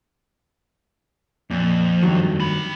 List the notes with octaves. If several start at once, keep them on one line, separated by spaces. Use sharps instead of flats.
F2 A#2
G2 D#3 F#3
C4 B5